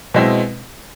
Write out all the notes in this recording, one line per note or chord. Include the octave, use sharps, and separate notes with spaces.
B2 G#3 C4 E4